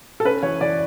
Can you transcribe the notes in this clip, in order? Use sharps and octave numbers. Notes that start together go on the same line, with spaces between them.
A4
C#4 B4
E3 C#5
E3 D5